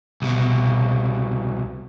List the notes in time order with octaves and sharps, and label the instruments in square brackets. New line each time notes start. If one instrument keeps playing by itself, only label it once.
[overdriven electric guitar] C2 B2